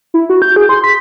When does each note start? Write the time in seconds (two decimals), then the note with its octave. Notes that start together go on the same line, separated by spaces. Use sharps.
0.14 E4
0.30 F#4
0.42 G6
0.56 G#4
0.69 C6
0.84 B6